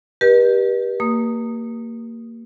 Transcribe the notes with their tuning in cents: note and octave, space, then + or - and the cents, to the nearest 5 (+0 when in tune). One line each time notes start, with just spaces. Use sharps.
G4 +0 B4 -40 D#5 -45
A#3 -25 D#6 +0